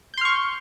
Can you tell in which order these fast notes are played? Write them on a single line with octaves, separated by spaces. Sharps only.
G6 C6 F6 C#6